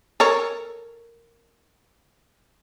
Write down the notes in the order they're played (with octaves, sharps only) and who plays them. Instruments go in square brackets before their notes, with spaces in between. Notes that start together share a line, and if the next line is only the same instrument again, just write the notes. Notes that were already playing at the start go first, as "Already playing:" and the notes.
[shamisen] A4 A#4 C#5